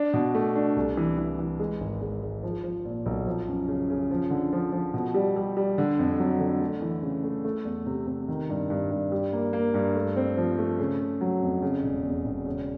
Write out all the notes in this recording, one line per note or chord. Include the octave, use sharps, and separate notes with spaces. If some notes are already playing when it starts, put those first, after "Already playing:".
Already playing: D4
B2
A3
D4
C2
E3
E3
E3
G#3
G#1
G#3
G#3
F3
F3
A#2
B1
F3
F#2
C#3
C#3
F3
D3
F3
F3
B2
G3
G3
G3
D3
F2
F#3
D3
A3
E3
C#3
A3
A3
E2
C3
C3
D#3
G2
G2
G2
G3
A#3
A#3
G2
A3
C4
F3
A3
C#3
C#3
F#3
F2
C#3
E1
E2
E1
C#3